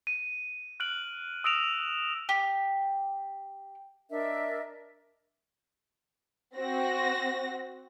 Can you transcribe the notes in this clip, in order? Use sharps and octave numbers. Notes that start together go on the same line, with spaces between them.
D#7
F6 F#6 D7 F#7
D#6 E6 A#6 D7 E7 F7
G4
D4 A#4 D#5 E5
C4 F#4 A#6